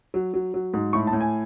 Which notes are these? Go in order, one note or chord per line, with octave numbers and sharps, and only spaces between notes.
F#3
F#3
F#3
G#2
A2 C#6
A5
A2
G#5